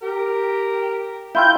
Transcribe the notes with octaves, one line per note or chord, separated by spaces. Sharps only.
G4 A#4
E4 F4 G5 G6